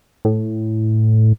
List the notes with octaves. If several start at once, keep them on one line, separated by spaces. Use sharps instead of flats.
A2